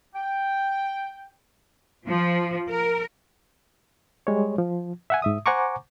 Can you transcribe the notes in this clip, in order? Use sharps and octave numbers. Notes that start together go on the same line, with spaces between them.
G5
F3
A#4
G3 G#3 C#5
F3
E5 F#5 G#5
G#2 E5 D#6
C5 F#5 G#5 A#5 C#6 D6